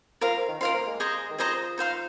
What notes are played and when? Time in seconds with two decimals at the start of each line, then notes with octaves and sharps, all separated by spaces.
0.21 F3 A#4 F5 C6
0.49 D#3
0.61 F3 A#4 F5 C6
0.74 A#3
0.87 G#3
1.00 G#4 C5 D#5 A#5
1.31 D#3
1.38 F3 G#4 C5 D#5 A#5
1.78 D#4 C5 F5 C6